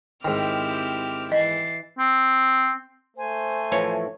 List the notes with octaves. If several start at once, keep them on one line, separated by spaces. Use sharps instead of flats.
G#2 D#3 C4 E4 G4 D6 F6
E3 D#5 A6 C7
C4
A3 C5 G#5
A2 E3 F3 C#5